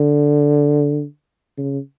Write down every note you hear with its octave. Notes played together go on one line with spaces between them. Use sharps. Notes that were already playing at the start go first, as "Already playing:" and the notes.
Already playing: D3
C#3